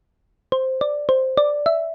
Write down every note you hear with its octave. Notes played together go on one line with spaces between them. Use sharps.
C5
D5
C5
D5
E5